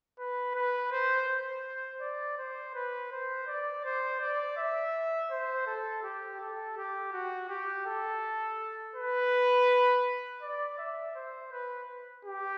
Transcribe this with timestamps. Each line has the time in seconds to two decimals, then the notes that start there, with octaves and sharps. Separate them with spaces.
0.19 B4
0.55 B4
0.92 C5
1.28 C5
2.01 D5
2.38 C5
2.74 B4
3.12 C5
3.47 D5
3.84 C5
4.20 D5
4.57 E5
5.31 C5
5.66 A4
6.03 G4
6.40 A4
6.77 G4
7.13 F#4
7.49 G4
7.86 A4
8.96 B4
10.42 D5
10.78 E5
11.15 C5
11.52 B4
12.25 G4